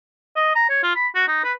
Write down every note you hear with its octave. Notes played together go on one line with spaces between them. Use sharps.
D#5
A#5
C#5
F4
B5
F#4
D#4
B4